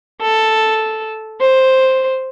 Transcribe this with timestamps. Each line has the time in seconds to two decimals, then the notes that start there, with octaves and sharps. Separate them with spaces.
0.21 A4
1.41 C5